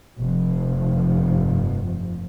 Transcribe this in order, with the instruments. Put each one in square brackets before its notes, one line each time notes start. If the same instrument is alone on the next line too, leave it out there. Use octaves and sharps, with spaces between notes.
[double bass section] F1 G2 F3